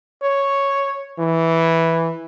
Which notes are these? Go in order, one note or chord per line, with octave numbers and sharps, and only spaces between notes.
C#5
E3